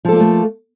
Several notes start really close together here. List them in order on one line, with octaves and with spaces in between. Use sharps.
F3 A4 A#3 F4 A3